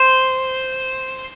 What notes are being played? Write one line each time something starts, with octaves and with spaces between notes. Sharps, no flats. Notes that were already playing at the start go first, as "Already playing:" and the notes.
Already playing: C5